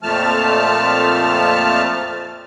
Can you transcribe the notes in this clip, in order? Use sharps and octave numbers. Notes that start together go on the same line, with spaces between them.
F2 A#2 F3 A3 A5 F6